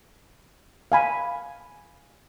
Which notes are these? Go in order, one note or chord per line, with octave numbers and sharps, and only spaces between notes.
F5 G#5 B5